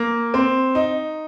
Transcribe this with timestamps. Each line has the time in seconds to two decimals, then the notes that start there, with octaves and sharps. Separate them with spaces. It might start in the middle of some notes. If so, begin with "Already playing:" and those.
Already playing: A#3
0.34 C4
0.75 D#4